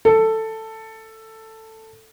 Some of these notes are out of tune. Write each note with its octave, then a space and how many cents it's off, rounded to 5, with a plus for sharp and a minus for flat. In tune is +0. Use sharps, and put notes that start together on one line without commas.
A4 +10